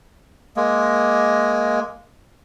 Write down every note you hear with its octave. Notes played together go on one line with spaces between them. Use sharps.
G#3 A#3